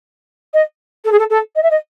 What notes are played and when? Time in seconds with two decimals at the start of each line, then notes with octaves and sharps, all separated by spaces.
0.54 D#5
1.05 A4
1.12 G#4
1.19 A4
1.30 A4
1.56 D#5
1.63 E5
1.71 D#5